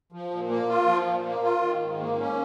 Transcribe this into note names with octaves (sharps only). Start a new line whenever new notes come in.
F3
A#2
A#3
F4
F3
A#2
A#3
F4
D#3
G#2
A#3
C#4